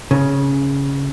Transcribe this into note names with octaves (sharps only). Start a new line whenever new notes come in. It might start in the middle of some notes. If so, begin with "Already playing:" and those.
C#3